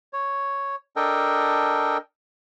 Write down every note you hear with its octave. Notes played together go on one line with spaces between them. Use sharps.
C#5
D4 A4 A#4 D#5 G5